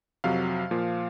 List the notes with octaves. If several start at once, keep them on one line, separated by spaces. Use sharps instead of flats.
F2 C3 F#3 F5
A#2 F3